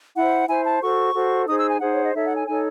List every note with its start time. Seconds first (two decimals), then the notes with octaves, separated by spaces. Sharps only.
0.15 E4 C5 F#5
0.48 E4 C5 G#5
0.65 A5
0.82 F#4 A4 C5 C#6
1.14 F#4 A4 C5
1.47 D#4 G#4 C5 D#6
1.59 E6
1.70 G#5
1.80 D#4 G#4 C5 F#5
1.92 C#5
2.03 D#5
2.14 D#4 A4 C#5 E5
2.25 F#5
2.36 G#5
2.47 D#4 A4 C#5 G#5